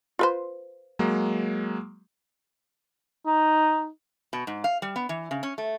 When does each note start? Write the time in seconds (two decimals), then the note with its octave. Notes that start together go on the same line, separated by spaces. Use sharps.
0.19 F4 B4 C5
0.99 F#3 G#3 A#3
3.26 D#4
4.33 B2
4.47 G#2
4.64 F5
4.82 G3
4.96 B3
5.09 E3
5.31 C#3
5.43 C#4
5.58 A3